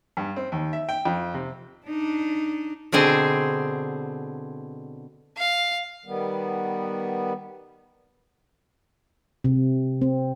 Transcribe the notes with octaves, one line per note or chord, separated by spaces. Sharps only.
G2
C4
D#2
E5
G5
F2
C3
D4 D#4
B2 D3 C4 G#4 C5
F5
D#3 G3 B3
C3
C4